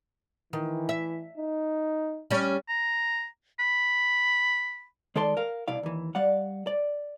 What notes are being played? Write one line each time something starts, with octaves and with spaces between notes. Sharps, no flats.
D#3 E3
E5
D#4
G3 C#4
A#5
B5
D#3 G#3 A4 D5 A5 C6
A#4 F5
C2 B2 E4 D5 F5
D#2 E3
G3 D5 F5 F#5
D5